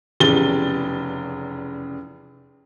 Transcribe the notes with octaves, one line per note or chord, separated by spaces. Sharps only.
F1 E2 C#3 G4 A6 G7